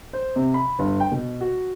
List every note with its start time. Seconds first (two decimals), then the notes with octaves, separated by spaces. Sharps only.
0.13 C5
0.36 C3
0.54 B5
0.79 G1
1.00 G5
1.12 B2
1.41 F#4